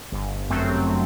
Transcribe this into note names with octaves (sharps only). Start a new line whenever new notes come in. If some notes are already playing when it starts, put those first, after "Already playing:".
G1
F#2 F#3 A3 C4